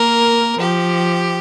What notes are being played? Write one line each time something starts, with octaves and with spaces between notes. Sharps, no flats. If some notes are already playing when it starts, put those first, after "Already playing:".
Already playing: A#3 A#4
F3 G4